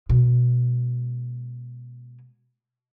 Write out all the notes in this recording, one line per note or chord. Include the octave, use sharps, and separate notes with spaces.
B2 G#3